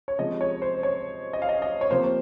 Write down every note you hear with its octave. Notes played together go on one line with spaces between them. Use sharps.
C#5
C3 F3 G#3 D#5
C#5
C5
C#5
D#5
F5
D#5
D#5
C#5
C3 F3 A#3 C5